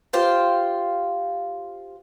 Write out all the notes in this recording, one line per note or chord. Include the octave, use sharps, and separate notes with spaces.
F4 G4 C5 F5 G5